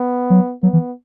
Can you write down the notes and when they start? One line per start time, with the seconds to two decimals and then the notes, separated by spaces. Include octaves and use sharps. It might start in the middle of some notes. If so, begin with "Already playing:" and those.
Already playing: B3
0.30 F#3
0.63 F#3 B3
0.73 E3